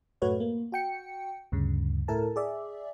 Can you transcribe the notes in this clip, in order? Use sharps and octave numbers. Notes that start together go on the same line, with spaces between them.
F#2 A2 A3 F#4 B4 C#5
A#3
F#4 G5 C#7
D2 G2 C#3
A2 E4 A4 A#4 A5
G#4 D5 E5